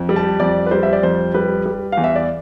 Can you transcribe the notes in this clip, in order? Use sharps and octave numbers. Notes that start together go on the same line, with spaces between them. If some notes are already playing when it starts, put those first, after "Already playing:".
Already playing: F2
G3
A5
F2 D5
B4
G3 C5
E5
D5
F2 C5
G3 B4
G3
E2 F5
E5
D5